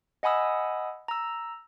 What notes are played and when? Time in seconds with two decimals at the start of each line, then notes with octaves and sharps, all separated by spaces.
0.23 D#5 F#5 G#5 B5 D#6 E6
1.08 A#5 E6